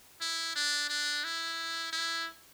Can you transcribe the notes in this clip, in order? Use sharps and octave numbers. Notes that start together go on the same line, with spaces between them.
E4
D4
D4
E4
E4